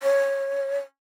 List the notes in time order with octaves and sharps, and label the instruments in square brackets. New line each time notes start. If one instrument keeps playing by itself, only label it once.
[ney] C#5